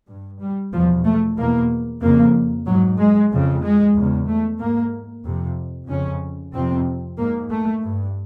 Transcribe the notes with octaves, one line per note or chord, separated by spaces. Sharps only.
G2
G3
E2 B2 F3
A3
E2 B2 A#3
F2 C#3 A#3
G#2 F#3
G#3
F2 C#3
G#3
E2 C#3
A3
G#2 A#3
F2 C3
F2 C#3 C#4
F2 C3 C4
G#2 A#3
A3
G2